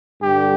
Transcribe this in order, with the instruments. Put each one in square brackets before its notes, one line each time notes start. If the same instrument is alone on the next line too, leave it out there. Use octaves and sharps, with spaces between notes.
[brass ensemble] G2 D3 G3 [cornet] G4